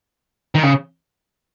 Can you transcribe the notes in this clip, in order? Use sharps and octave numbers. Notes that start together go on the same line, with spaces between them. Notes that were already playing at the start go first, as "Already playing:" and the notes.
D#3
C#3